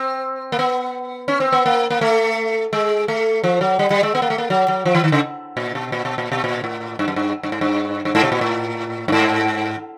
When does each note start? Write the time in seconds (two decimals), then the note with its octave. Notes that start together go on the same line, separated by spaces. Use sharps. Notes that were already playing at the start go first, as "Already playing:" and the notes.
Already playing: C4
0.52 A#3
0.59 B3
1.28 C#4
1.40 C4
1.52 B3
1.66 A#3
1.90 A#3
2.01 A3
2.73 G#3
3.08 A3
3.44 F3
3.61 F#3
3.79 G3
3.91 G3
4.03 G#3
4.15 B3
4.22 A#3
4.30 A3
4.38 A#3
4.50 F#3
4.68 F#3
4.85 F3
4.95 E3
5.04 D#3
5.12 C#3
5.57 A#2
5.75 B2
5.92 A#2
6.05 B2
6.18 A#2
6.32 B2
6.44 A#2
6.64 A2
6.99 G2
7.08 F#2
7.16 G2
7.43 G2
7.52 G#2
7.61 G2
8.05 G2
8.15 G#2
8.24 B2
8.32 A#2
8.41 A2
9.08 G2
9.12 G#2